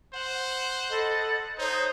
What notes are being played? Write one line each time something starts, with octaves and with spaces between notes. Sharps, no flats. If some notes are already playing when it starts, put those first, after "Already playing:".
C5 F#5
A4 D#5 B5
D#4 C5 C#5 D#6 G6